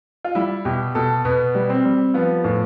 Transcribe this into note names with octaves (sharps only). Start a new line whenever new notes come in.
F4
G3 E4
B2 G4
B2 A4
B2 B3
G3
C4
G3
F3 B3
A2